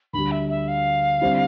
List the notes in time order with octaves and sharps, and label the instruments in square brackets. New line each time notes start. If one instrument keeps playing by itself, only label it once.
[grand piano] D2 D3 G3 [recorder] B5
[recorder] E5
E5
F5
[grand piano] D3 G3 C4 E4